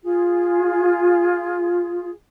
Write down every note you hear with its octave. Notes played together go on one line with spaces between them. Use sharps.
F4 G#4